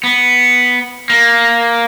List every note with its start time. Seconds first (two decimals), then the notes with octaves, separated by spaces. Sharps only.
0.04 B3
1.10 A#3